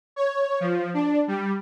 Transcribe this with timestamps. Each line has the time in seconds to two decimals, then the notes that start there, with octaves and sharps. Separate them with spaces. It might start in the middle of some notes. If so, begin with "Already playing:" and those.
0.16 C#5
0.60 F3
0.94 D4
1.28 G3